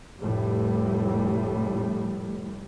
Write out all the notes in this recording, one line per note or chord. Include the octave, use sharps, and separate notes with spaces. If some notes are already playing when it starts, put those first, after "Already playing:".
F1 A2 G3